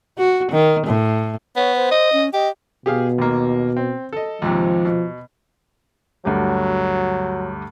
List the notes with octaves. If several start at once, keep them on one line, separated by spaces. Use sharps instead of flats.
F#4
D#3
A2
B3 C#5
C5
D#5
C#4
G4 D#5
B2 G4 G#4 F5
D#2 A#3
C4
A4 D#5
D#2 G#2 C3 F3
B2
D2 G2 F#3 G4